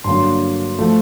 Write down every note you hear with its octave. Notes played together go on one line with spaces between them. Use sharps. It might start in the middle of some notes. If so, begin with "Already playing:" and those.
G2 D3 F#3 A#3 C6
F3 A3